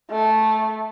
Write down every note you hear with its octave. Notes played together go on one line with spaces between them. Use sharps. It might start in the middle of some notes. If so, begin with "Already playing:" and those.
A3